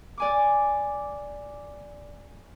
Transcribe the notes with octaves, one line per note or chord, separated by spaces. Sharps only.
D5 G#5 D6